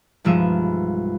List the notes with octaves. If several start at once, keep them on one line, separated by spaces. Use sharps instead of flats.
B1 G2 F3 G#3 E5 D#7